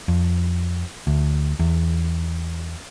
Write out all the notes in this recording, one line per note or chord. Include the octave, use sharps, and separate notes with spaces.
F2
D2
E2